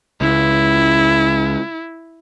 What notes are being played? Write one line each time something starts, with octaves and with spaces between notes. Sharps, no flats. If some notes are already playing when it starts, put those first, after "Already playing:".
C#2 E4